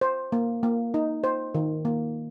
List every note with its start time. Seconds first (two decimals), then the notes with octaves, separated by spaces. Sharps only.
0.01 C5
0.32 A#3
0.63 A#3
0.94 D#4
1.24 C5
1.55 D#3
1.85 A#3